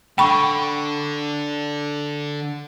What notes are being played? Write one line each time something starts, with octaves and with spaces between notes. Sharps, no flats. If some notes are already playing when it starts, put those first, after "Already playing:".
D3 G5 B5 C#6